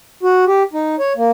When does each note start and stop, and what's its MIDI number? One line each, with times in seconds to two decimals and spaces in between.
0.23 0.45 66
0.47 0.63 67
0.73 0.96 63
0.99 1.13 73
1.16 1.31 58